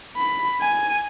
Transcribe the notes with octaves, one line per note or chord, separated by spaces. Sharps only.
B5
G#5